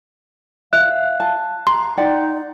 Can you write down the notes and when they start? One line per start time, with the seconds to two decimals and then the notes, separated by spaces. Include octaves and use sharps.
0.73 E5 F5 F#6
1.20 A5
1.67 A#5 C6
1.97 D#4 D5 F#5 G5